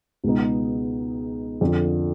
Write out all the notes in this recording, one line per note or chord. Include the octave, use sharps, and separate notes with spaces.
C#2 B2 G#3 B3 D#4
F2 D3 F3